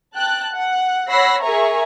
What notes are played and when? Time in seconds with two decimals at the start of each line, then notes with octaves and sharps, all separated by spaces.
0.15 G5 A5 F#6
0.53 F#5
1.09 C#5 F#5 B5 E6 A#6 C7
1.41 G#4 A#4 E5 G#5 A#5 C#6